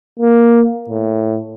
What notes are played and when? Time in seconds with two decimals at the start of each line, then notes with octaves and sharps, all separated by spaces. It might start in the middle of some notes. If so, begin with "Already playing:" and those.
0.20 A#3
0.89 A2